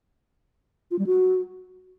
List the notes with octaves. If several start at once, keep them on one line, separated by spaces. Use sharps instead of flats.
F4
G3
F#4